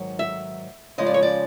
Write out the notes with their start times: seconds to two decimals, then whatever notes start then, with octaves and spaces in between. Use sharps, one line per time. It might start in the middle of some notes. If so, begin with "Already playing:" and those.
Already playing: G#2 D#3 F#3
0.19 E5
0.98 C#3 F3 G#3 D#5
1.06 D5
1.14 C#5
1.23 D5